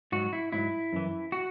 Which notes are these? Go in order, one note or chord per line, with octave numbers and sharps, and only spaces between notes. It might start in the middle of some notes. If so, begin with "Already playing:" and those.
G#2 F#3 F#4
E4
G#2 F#3 E4
F#2 E3
F#4